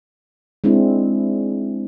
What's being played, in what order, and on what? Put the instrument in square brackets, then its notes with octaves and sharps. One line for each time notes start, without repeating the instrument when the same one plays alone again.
[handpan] G#3 C4 D4 E4